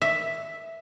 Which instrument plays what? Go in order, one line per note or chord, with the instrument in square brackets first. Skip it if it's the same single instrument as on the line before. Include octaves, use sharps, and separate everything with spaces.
[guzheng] E5